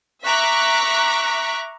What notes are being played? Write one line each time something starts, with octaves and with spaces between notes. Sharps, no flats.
E5 A#5 C#6 D6 F#6 B6